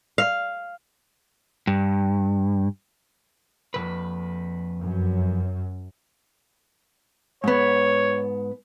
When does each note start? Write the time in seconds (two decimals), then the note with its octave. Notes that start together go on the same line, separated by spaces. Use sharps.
0.18 F5
1.67 G2
3.74 F2 C3 B4
4.82 F#2
7.44 G#2 B3 C#5